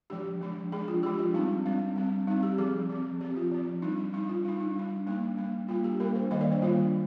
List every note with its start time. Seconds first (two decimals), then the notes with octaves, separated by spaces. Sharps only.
0.10 F3 G#3 D4 G4
0.41 F3 G#3 D4
0.72 F3 G#3 D4 G#4
0.88 F4
1.03 F3 G#3 D4 G4
1.19 F4
1.34 G3 C4 D#4
1.66 G3 C4 D4
1.96 G3 C4
2.27 G3 C4 D#4
2.43 G4
2.58 F3 C4 G#4
2.89 F3 C4
3.21 F3 G4
3.25 C4
3.36 F4
3.52 F3 C4
3.82 G3 D4 D#4
3.98 D4
4.13 G3 D#4
4.17 D4
4.29 F4
4.45 G3 D4 D#4
4.60 D#4
4.76 G3 D4
5.07 G3 A#3 D4 D#4
5.37 G3 A#3 D4
5.68 G3 A#3 D4 F4
5.84 G4
6.00 G3 A#3 D4 A#4
6.15 C5
6.31 D#3 G3 A#3 D4 D#5
6.41 D5
6.52 C5
6.62 D#3 G3 A#3 D4 F4